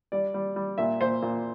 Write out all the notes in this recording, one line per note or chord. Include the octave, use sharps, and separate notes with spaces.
G3 D5
G3
G3
A#2 E5
A#2 C5
A#2